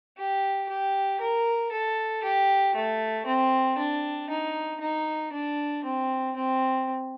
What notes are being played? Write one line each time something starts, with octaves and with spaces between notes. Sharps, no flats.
G4
G4
A#4
A4
G4
A3
C4
D4
D#4
D#4
D4
C4
C4